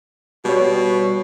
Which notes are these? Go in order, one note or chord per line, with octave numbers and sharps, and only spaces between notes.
B2 G3 C#5